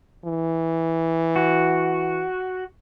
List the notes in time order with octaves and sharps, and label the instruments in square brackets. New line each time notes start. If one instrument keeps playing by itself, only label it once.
[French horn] E3
[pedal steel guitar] F#4